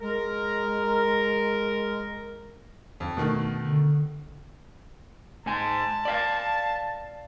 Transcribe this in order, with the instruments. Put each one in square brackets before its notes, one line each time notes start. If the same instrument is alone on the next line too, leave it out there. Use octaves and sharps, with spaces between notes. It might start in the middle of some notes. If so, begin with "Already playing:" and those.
[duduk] G#3 [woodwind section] A#4
[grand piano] F2
B2 D#3 A3
[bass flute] D3
[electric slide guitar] G#2 G#5 [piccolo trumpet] A5
[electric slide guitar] D5 F5